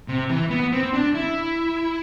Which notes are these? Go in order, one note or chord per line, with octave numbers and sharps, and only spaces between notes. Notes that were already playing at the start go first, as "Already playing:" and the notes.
C3
E3
B3
C4
D4
E4